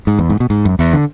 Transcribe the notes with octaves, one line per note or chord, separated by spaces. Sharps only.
G#2
E2
G#2
B2
G#2
F#2
E2
D3